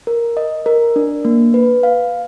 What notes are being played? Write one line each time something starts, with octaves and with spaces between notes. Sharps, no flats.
A#4
D#5
A#4
D4
A#3
B4
F5